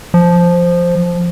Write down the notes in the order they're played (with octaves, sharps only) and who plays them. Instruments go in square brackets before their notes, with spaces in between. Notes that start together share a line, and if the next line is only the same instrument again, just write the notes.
[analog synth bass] F3